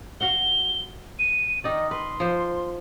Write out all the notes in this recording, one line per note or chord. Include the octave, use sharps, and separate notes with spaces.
F#4 F5 F#5 G7
D#7
D#3 D#4 D5 D#5
B4 C6
F3 C5